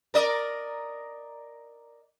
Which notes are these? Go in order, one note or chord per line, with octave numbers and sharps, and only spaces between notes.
A#4 D5 D#5